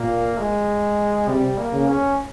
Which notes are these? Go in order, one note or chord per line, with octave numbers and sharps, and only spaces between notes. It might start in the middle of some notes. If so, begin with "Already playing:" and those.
Already playing: A#2 A#3
G#3
C3 G3
A#3
C#3
C#4